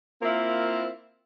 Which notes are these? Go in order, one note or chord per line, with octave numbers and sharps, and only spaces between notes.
A#3 C4 E4 F4 A#4